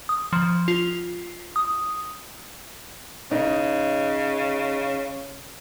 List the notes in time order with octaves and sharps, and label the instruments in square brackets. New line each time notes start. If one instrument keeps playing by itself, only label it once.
[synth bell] D#6
F3
F4
D#6
[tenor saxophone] C#3 [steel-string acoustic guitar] D#4